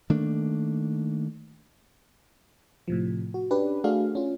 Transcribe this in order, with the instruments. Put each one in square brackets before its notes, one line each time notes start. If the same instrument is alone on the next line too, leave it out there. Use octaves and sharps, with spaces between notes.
[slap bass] D#3 A3 A#3 D4
[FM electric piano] A2 C3 F3
F#4
C#4 D4 G4 B4
A3 D4 F#4 G#4 F5
C#4 F4